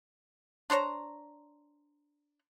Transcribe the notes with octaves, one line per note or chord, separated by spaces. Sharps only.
D4 C5 C#5 A#5